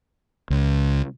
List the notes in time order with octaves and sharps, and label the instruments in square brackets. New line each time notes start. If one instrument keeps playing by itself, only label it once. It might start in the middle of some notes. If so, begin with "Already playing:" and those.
[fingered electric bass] C#2